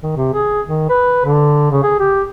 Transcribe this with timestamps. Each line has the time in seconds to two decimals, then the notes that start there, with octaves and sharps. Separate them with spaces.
0.03 D#3
0.16 C3
0.34 G#4
0.67 D#3
0.90 B4
1.26 D3
1.71 C#3
1.83 G#4
2.00 G4